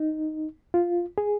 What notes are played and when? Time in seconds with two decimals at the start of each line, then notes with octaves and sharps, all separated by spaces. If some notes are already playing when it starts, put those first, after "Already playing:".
Already playing: D#4
0.74 F4
1.18 G#4